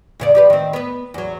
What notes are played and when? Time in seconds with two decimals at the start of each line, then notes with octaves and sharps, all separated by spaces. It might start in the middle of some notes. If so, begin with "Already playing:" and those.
0.20 E2 C#3 D5
0.35 F3 G4 B4
0.50 D#3 C4
0.73 B3 B4
1.14 E2 F#3